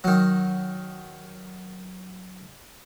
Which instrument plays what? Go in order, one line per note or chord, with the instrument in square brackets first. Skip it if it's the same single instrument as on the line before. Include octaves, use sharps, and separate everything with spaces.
[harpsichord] D#3 F#3